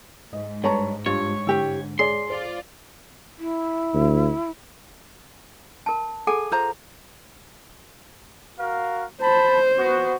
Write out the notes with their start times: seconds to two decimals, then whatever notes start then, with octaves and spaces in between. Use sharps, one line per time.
0.33 G#2 D#5
0.64 G2 B4 C#5 A5 A#5 C#6
1.06 G2 F4 C#5
1.47 D3 E4 G4 G5
1.99 G#4 C#5 D5 C6
2.30 F4 C5 D5 F5
3.39 E4
3.94 D2
5.86 A#4 A5
6.27 G#4 A4 F#5 G#5
6.52 F4 C5 A#5
8.58 F#4 A#4 F5
9.22 C5 A5 B5
9.77 B3 F#4